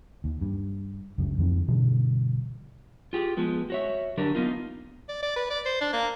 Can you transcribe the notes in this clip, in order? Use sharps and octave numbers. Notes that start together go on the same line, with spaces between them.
D#2
G2
F#1 C#2 F#2
F2 D#3 C4
G2 B2 D3 E3
F4 G4 G#4
F3 G#3 B3
F#4 C#5 E5
D3 F#3 D4 G4 A#4
A#3 B3 D#4 F4
D5
D5
B4
D5
C5
D4
A#3